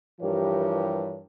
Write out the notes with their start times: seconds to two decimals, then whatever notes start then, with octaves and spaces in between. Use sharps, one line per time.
0.21 G2 E3 F3 G4 A#4 C#5